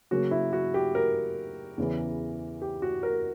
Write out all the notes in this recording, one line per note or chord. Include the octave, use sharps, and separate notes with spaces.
C#3 F#3 A#3 F#4
E4
F#4
G4
A#4
E2 C#3 E3 B3
G4
F#4
A#4